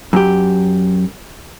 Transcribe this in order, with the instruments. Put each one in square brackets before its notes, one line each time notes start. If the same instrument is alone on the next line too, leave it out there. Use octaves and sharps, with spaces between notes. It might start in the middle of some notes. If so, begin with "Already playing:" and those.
[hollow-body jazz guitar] F#2 G4